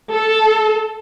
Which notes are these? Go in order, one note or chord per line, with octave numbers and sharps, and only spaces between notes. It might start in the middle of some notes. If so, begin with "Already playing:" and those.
A4